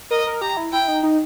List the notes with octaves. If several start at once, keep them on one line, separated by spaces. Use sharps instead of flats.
A#4 D#5
A#4
G4 A#5
E4
E4 G5
D#4
D#4